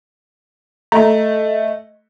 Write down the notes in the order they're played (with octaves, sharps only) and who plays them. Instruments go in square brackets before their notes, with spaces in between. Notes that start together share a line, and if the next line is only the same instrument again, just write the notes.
[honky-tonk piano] A3 [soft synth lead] D#5 [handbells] A#5